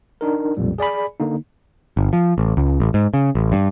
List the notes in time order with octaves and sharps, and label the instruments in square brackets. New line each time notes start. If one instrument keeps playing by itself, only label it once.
[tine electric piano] D4 D#4 A#4
B1 F2 A#2 G3
G#4 D5 G#5 B5
D3 A#3 D#4
[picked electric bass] G1
F3
A1
C#2
A1
G#2
C#3
A1
G2